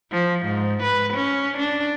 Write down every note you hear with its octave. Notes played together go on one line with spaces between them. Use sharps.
F3
G#2
B4
C#4
D4